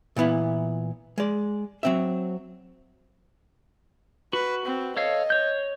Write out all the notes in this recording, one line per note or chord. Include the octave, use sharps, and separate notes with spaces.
A#2 E3 B3 E4
G#3 D5
F#3 C4 E5
F#4 B4
C4
A4 C#5 D#5 F5
C#5 G6